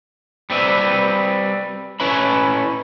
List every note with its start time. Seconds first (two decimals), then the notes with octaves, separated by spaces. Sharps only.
0.50 G3 C4 B4 E5
2.00 C#4 E4 B4 C#5 E5 B5